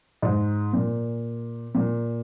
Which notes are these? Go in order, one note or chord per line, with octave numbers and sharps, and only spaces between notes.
G#2
A#2
A#2